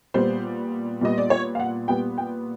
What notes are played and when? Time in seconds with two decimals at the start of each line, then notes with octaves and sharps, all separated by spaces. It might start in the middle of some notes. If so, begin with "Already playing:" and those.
0.14 A#2 G3 B3 C5
1.01 A#2 G3 B3 D#5
1.18 D5
1.30 C#5
1.55 F5
1.60 F#5
1.88 A#2 G3 B3 G5
2.18 G5